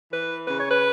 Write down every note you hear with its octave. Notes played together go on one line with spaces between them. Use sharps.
E3 B4
C#3 B4
C#5
B4